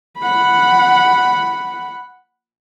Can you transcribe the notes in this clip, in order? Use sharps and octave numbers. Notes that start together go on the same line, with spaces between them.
F#5 B5